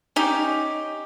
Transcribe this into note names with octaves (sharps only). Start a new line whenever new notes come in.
C#4 D#4 G4